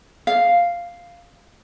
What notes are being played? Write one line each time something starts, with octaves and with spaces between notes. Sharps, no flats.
F5